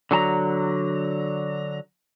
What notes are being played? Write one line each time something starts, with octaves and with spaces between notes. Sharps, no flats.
D3 F#3 A5 A#5